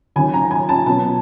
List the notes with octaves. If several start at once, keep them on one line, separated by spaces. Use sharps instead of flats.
D#2 D#3 F#3 G#5
A#5
G#5
A5
B2 F#3 B3 A5